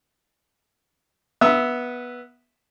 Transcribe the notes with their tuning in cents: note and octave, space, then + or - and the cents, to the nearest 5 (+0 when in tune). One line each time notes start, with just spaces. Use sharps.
B3 -10 E5 +0 D#6 +40